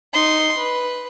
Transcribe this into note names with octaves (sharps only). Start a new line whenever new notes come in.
D#4 C6
B4